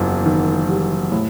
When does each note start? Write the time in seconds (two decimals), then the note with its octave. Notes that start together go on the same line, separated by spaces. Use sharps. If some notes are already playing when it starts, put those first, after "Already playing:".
Already playing: F#1 E2
0.26 D#3
0.69 G3
1.12 A2